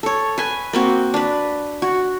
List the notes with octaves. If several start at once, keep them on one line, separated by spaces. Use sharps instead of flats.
A4 C#5
B4 G#5
A#3 C4 F#4
D4 B4
F#4